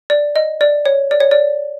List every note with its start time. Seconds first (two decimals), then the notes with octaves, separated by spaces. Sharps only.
0.10 D5
0.36 D#5
0.61 D5
0.86 C#5
1.11 D5
1.20 C#5
1.31 D5